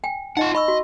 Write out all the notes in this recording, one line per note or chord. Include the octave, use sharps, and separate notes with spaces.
G5 G#5
D#4 F4 D#5 F#5
D#5 B5 C#6 E6
F#4